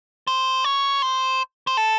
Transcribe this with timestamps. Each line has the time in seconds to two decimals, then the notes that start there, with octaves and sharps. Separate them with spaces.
0.27 C5
0.64 C#5
1.02 C5
1.67 C5
1.77 A4